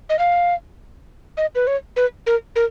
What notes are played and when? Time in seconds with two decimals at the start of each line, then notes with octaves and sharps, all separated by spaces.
0.10 D#5
0.19 F5
1.37 D#5
1.55 B4
1.67 C#5
1.96 B4
2.27 A#4
2.56 A#4